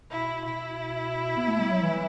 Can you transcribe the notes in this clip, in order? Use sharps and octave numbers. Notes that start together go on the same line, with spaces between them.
B2 E4
B2 E4
B3
A3
G3
F#3
E3